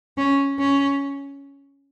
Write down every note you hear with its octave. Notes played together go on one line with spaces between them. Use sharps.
C#4
C#4